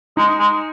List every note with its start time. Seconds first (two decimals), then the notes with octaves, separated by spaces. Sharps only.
0.17 G#3 D#4
0.39 G#3